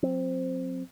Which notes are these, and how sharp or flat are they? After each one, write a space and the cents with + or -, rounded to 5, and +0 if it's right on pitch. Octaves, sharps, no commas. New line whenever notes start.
F#3 -35 C4 +0